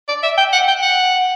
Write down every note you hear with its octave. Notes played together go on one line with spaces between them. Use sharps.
D5
E5
G5
F#5
G5
F#5